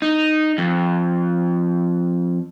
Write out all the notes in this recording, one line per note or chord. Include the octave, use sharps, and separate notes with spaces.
D#4
F2